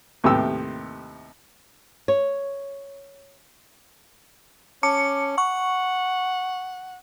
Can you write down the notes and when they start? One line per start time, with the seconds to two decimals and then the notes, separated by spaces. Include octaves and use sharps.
0.24 D#2 A2 C3 B3 G4 E6
2.08 C#5
4.83 C#4 A5 D6 C#7
5.38 F#5 C#6